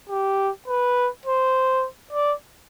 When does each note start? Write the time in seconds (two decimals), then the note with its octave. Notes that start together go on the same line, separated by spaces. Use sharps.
0.09 G4
0.68 B4
1.26 C5
2.12 D5